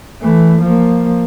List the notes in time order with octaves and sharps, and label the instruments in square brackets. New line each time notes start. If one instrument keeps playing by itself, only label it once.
[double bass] E3 A3
F3 A#3